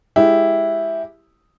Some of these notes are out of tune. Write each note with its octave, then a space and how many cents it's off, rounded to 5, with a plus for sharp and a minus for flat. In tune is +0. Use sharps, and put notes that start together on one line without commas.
G#3 +0 E4 +0 G4 +0